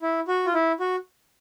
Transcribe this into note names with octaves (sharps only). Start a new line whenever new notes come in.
E4
F#4
F4
E4
F#4